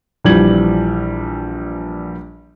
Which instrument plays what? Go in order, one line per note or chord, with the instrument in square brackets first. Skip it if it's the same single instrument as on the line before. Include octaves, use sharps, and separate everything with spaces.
[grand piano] A#1 E3 F3 G3 G#6 F#7